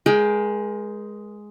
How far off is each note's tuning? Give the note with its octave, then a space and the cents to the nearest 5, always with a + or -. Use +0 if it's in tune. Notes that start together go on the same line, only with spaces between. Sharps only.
G#3 +5 A#4 +35 G5 +0